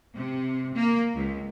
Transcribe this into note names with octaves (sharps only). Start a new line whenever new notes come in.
C3
A#3
C#2